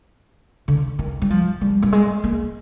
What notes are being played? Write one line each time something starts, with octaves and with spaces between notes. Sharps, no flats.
D3
D#3
G3
F3
G3
G3
G#3
A#3